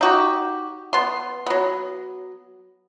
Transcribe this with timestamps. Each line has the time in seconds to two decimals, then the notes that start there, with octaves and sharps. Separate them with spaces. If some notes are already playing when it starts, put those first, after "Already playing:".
0.01 D#4 F#4 G4
0.93 B3 C6
1.46 F#3 B3